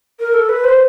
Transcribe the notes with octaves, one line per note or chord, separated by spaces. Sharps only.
A#4
A4
B4
C5